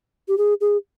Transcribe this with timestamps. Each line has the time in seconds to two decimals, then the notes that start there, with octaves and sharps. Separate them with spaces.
0.28 G4
0.38 G#4
0.61 G#4